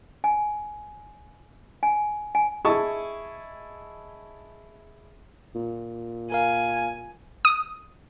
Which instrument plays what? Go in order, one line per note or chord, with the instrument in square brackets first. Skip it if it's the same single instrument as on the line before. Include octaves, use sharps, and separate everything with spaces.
[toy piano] G#5
G#5
G#5
[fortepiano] E4 G#4 D#5 A5 C#6
[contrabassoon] A#2
[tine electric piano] A#4 F5 [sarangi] G#5
[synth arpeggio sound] D#6